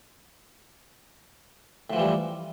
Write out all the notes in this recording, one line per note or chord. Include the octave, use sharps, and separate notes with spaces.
A2 E3 F3 G3